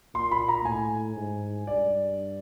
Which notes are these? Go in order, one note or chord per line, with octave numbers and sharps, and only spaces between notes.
A#2 C6
B5
A#5
A2 G#5
G#2
G2 D5